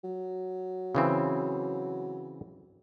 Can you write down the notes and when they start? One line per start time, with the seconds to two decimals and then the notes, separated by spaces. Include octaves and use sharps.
0.04 F#3
0.95 C#3 E3 C4